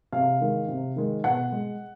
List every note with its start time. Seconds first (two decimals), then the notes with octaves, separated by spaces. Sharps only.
0.12 C3 F5
0.41 D#3 G#3
0.68 C3
0.96 D#3 G#3
1.24 B2 F#5
1.52 G#3